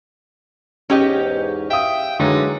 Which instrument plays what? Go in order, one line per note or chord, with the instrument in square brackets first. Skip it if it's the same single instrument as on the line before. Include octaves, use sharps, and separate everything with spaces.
[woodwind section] E2 G#2 [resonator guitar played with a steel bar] C#4 G4 D#5
[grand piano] E5 D#6 [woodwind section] F5 [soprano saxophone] G5
[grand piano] D3 F#3 G#3 [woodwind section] E3 A#3 C#5 [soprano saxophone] D#4